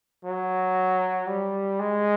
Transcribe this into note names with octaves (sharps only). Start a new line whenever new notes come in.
F#3
G3
G#3